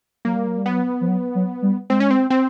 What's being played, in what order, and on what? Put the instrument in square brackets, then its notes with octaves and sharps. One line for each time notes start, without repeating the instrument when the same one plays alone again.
[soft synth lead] F#3 [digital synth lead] A#3
[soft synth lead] G3
F#3
G3
[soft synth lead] F#3 [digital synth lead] B3
[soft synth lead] F3
F#3
F#3
G3
[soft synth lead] G#3 [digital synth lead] C4
[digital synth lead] C#4
C4
C4